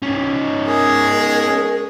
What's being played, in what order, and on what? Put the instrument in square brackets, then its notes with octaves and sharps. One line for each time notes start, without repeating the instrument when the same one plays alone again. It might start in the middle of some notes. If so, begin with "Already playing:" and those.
[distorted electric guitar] C#4 D#4
[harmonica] G#3 G#4 [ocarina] A#4